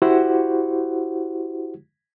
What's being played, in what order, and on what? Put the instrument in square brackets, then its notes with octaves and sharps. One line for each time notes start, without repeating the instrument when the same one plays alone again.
[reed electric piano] E4 F#4 G4 C5 F#5